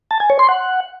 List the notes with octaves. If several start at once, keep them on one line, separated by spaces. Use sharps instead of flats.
A5
G#5
C#5
C6
F#5